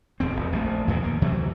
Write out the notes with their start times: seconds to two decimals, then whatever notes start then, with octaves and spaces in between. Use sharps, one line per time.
0.20 D#1 F2 C4
0.36 E1
0.53 A#1 A3
0.88 E2 A#2 D3 D#3
1.03 D#3 A#3
1.22 D2 C3 E3 F#3